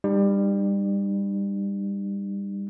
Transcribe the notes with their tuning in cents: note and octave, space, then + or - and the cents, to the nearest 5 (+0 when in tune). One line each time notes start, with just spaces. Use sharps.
G3 +25 D#4 -35